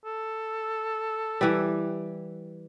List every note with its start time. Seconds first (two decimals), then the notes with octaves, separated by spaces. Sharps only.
0.05 A4
1.41 E3 G3